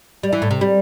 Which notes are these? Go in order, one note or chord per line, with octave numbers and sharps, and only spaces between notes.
G3
E3
A2
C3
G3